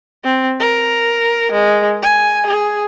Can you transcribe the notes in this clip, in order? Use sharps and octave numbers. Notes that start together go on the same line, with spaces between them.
C4
A#4
G#3
G#5
G#4